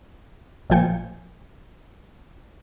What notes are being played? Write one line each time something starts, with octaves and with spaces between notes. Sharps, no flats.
A1 A#2 F3 G5 G#5 C#7